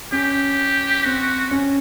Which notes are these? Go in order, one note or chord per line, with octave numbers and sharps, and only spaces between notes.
C#4 G4
C4 F#4
C#4